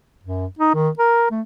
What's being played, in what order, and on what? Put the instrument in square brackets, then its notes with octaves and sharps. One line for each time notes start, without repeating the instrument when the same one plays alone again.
[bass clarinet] F#2
D#4
D#3
A#4
A3